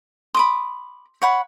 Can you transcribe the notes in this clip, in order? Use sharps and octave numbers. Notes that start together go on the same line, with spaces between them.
B5 C6 D6 D#6
C#5 F#5 B5